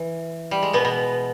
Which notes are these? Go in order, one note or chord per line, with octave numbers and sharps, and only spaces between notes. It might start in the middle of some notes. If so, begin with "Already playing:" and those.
Already playing: E3
G3
G#3
B2 B3
B2 B3